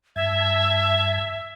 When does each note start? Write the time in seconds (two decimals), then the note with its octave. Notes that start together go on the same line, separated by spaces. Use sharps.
0.16 G2 E5 A5 G#6